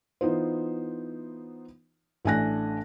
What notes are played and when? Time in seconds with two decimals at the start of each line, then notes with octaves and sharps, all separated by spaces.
0.21 E3 B3 D#4 F4 C5
2.25 A1 A3 D4 G#5 F#6 A#6